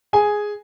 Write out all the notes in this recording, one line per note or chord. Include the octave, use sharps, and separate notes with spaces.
G#4 G#5